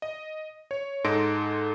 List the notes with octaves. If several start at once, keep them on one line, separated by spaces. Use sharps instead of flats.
D#5
C#5
G#2 D#4 A4 C6 A#6 D7